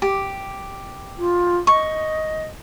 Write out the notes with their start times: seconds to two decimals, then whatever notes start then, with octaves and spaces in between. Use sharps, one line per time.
0.02 G4
1.18 F4
1.67 D#5 C#6